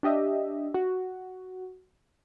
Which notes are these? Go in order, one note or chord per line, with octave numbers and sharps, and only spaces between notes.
D4 G4 D#5 E5
F#4